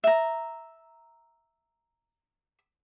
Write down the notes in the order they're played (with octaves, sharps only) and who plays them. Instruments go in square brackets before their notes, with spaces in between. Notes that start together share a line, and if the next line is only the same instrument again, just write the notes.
[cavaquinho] E5 A#5